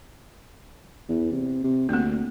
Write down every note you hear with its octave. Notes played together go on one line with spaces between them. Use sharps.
E2
C3
C3
D2 A#3 C4